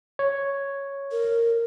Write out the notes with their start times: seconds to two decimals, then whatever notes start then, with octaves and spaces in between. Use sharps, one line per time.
0.19 C#5
1.12 A#4